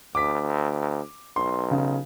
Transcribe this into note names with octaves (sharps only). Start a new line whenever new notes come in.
D2 D6 B6
B1 C6
C#3